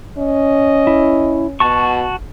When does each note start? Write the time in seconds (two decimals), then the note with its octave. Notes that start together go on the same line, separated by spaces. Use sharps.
0.18 C#4 D#5
0.87 E4
1.60 B2 F#4 A5 C#6